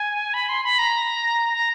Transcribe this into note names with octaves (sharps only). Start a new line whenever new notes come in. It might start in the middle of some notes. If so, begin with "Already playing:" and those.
Already playing: G#5
B5
C6
B5
A#5
A#5